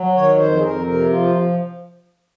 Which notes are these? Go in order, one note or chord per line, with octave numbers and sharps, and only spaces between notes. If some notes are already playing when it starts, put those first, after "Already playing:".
Already playing: F#3
D#3 C#5
F2 C5
G#4
F2 A#4
C3 A#4
F3 F4